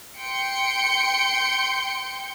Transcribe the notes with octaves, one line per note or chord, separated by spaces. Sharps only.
G5 C6 G6 C#7